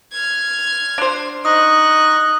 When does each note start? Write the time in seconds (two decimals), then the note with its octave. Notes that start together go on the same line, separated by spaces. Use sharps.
0.12 F6 G#6
0.98 D4 C5
1.45 D#4 D#5 C#6 D#6 F#6